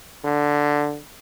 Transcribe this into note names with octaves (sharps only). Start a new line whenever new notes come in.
D3